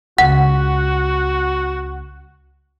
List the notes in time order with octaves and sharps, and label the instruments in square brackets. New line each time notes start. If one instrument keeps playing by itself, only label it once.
[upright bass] C#2 [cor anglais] F#4 [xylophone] F#5